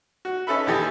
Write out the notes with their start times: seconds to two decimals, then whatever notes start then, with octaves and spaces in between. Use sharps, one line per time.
0.25 F#4
0.47 C#4 D#4 A4 B4 E5 B5
0.67 D#2 E3 G4 A4 D#5